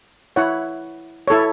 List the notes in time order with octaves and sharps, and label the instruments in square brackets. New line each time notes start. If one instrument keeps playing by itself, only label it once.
[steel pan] E4 C#5 F#5
E4 A4 C#5